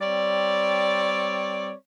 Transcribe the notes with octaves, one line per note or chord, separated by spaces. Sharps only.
G3 C4 C#5 D5